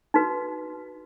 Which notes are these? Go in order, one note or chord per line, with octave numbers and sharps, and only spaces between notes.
D#4 F#4 B4